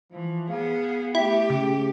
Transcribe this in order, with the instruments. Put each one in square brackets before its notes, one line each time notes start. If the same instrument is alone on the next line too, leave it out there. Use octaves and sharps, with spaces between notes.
[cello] E3 [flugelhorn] F3
[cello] B3 G#4 [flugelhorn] F5
[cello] A3 G4 [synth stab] E4 [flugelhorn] G5
[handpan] C#3